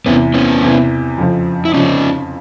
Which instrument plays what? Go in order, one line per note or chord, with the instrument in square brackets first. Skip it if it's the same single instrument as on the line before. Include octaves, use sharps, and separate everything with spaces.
[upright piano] E2 C3 E3 [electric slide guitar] B3 C#4
[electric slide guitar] B3 C#4
[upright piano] E2 C3 E3
F2 C#3 F3
[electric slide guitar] E4
[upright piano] F2 C#3 F3 [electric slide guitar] C#4 D#4